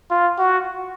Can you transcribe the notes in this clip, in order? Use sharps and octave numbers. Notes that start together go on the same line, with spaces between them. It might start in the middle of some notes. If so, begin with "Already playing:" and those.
F4
F#4